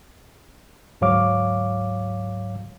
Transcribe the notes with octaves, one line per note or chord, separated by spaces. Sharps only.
D2 G#2 F#3 C#5 F5 D6